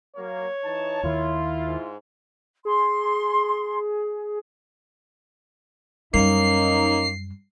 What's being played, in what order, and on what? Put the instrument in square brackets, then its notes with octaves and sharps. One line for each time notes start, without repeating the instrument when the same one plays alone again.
[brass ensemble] F#3 A#3 [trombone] C#5
[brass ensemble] E3 D#4 A5
[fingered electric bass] D#2 D#3 [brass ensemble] E4 F4
[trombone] G#2
[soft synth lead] G#4 [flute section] C6
[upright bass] F#2 G3 [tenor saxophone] A#3 [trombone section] C#4 D#4 [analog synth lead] C7